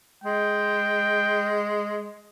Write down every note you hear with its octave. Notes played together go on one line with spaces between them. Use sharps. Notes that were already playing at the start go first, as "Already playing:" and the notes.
G#3 G5